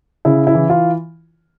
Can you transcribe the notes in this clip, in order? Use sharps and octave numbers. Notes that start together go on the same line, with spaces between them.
C#3 E4
E4
E3
F4